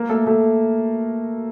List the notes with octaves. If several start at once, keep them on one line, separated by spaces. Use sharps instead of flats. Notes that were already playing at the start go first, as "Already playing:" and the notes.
Already playing: A#3 A#4
A3 A4
A3 A4